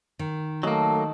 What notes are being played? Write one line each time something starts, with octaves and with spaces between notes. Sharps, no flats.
D#3
F#3 A3 A#3 A4 D#5 A5